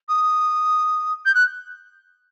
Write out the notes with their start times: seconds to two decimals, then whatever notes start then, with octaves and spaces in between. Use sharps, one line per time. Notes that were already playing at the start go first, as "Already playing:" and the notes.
0.08 D#6
1.25 G6
1.34 F#6